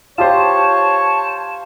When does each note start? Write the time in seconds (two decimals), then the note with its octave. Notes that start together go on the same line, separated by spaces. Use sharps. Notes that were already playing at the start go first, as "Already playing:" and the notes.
0.18 F4 G4 C5 C#5 A5